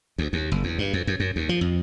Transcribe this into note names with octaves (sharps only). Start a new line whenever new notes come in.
D2
D#2
F#1
E2
G2
F2
F#2
F#2
D#2
F3
F2